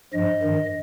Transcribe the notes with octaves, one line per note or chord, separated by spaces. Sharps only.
G2 F3 D#5
G2 D#3